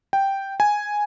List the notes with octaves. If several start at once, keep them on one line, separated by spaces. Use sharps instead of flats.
G5
G#5